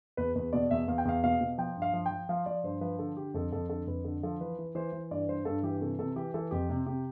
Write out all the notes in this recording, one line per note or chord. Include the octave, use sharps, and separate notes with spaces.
E2 B4
E2 B4
B2 D5
E2 E5
E2 F5
G5
E2 F5
B2 F5
B2
F3 G5
G2
F5
F3
G5
F3
F3 F5
F3 D5
G2 C5
F3 B4
D3 A4
D3 G4
F2 A4
F2 A4
D3 A4
F2 B4
D3 A4
F3 A4
E3 B4
E3
E3 C5
E3
G2 D5
G2 C5
G2 A4
E3 G4
C3 A4
C3 A4
E3 G4
E3 A4
F2 G4
C3
C3 G4